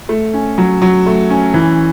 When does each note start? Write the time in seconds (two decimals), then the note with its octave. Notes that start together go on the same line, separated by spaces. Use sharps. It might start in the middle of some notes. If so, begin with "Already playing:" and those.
0.09 A3
0.33 C#4
0.58 F#3
0.82 F#3
1.06 A3
1.30 C#4
1.54 E3